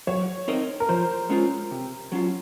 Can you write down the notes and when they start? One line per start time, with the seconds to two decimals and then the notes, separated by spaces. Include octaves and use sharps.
0.07 F#3 C#5
0.48 C4 D#4 A#4 D#5
0.80 A#4
0.89 F3 C5
1.29 G#3 C#4 F4
1.71 C3
2.12 F#3 C#4 F4